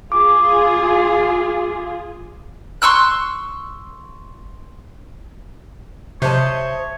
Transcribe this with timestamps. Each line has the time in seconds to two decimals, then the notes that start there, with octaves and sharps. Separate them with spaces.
0.12 F4 G#4 D6
2.82 C6 C#6 E6 F#6
6.22 C3 C5 C#5 D#5 E5 A5